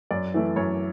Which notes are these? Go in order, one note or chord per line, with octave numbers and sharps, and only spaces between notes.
F#2 D5
E3 A3
F#2 C#5